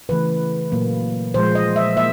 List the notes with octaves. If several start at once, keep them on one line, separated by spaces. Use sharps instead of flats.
C#3 E3 A3 B4
A#2 F#3 A#3
A#2 F3 G#3 C5
D#5
E5
A#3 E5